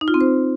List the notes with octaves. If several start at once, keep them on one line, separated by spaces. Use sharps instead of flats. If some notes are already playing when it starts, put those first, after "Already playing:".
D#4
F4
C4
C5